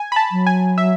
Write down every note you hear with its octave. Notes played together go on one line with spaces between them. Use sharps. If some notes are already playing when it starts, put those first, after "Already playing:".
Already playing: G#5
B5
A5
F#3
G#5
E5